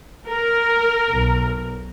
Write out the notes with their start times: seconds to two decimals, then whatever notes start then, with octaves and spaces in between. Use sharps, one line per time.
0.28 A#4
1.10 B1